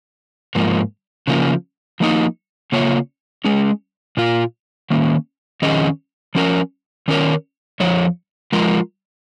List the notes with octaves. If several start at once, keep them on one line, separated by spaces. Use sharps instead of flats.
G#2 F3 A#3
C#3 F3 A#3
F3 A#3 D#4
C#3 A#3 F4 C#5
G#3 C#4 G#4
A#2 A#3 F4
D#3 A#3 C#4
F2 D#3 C#4 G#4 D#5
F3 C#4 A#4
D#3 C#4 A#4 C#5
F2 F3 C#5
F3 G#3 F4 A#4